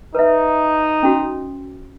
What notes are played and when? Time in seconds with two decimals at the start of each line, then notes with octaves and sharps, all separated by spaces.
0.15 D#4 B4 E5
1.03 C#4 F#4